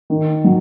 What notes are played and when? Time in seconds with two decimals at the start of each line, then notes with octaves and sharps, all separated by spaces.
0.10 D#3
0.44 F#3